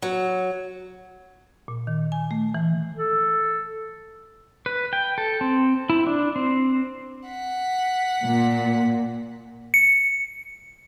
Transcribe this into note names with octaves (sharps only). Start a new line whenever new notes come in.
F#3
A#2
D#3
G#5
A3
E3
A4
B4
G5
A4
C4
E4
D4
C4
F#5 B6
A#2
C#7